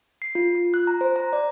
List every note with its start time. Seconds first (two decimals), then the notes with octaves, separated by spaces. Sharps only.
0.22 C7
0.35 F4
0.55 F4
0.74 F#6
0.87 A#5
1.01 C5
1.16 A#5
1.33 D5